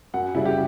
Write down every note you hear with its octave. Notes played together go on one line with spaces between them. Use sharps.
F#2 F#5
C#3 G3 E4
G4